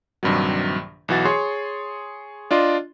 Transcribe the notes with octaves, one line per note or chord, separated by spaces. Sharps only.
A#1 G2 C3 D#3 F#3
B1 E3 F#4 A6
G#4 C#5 C6 C#6
D4 F4 D5 D#5 C6